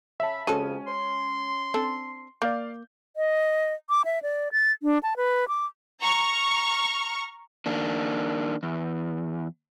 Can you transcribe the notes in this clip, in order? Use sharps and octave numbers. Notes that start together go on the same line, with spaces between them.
C#3 E5 A5 B5
F2 C#3 G#3 C#4 F#4 A4 D#7
C6
C4 D4 A4
A#3 D5 F5 G6
D#5
D6
E5
D5
A6
D4
A5
B4
D6
A#5 C#6 F6
D#3 A#3 D4
E2